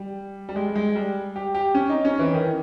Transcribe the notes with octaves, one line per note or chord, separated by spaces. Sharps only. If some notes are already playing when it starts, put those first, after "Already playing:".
Already playing: G3
G3
G#3
G#3
G3
G4
G4
C#4
D#4
C#4
E3
D#3